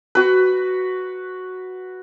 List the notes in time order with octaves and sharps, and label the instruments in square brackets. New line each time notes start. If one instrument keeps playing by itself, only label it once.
[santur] F#4 B4